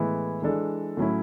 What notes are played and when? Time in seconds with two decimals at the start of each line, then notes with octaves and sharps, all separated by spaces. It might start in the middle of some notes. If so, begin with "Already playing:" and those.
Already playing: A2 E3 G#3 B3 E4
0.42 E3 G#3 D4 A4 D5
0.97 A2 F#3 C#4 E4